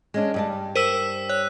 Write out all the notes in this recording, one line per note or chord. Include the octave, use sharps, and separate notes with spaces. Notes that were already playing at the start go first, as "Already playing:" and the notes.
G#3 C#4 D4
G2 G3 A5
A#4 C5 E6 B6 D#7 E7
C#5 F#6